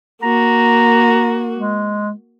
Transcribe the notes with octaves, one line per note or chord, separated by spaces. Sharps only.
A#3 F#4 A#5
G#3